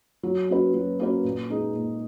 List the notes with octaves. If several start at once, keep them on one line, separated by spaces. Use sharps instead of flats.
F#3
A#3 C#4 F#4 B4
F#3
A#3 C#4 F#4 B4
A#2
G#3 D#4 G#4
A#2